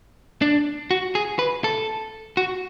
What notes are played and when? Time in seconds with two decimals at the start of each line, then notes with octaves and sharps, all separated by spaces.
0.42 D4
0.91 F#4
1.15 G#4
1.39 B4
1.64 A4
2.37 F#4